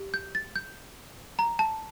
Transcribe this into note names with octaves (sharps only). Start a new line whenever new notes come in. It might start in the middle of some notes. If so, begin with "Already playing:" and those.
Already playing: G4
G6
A6
G6
A#5
A5